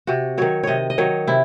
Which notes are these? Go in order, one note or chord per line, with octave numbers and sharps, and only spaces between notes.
C3 F#4
D#3 F#3 C#5
C3 C#5 D#5
D#5
D#3 F#3 C#5
C3 E4